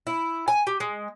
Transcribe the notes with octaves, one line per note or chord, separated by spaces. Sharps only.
E4
G#5
G4
G#3